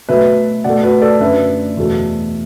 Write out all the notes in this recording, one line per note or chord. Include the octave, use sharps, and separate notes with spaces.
B2 F#3 A3 B4 E5
B2 A3 D5 F#5
F#4 B4
A4 D5
F#2 D3 A3 B4 E5
E2 B2 F#3 A3